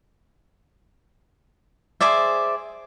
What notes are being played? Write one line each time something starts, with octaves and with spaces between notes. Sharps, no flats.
G#4 C5 D5 E5